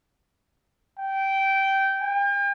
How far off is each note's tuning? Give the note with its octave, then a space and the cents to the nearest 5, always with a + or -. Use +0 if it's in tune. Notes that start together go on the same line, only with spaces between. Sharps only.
G5 -15
G5 +40